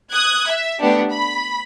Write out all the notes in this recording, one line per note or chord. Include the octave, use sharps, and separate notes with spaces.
D#6 F#6 G#6
E5
A3 B3 D4 G4
B5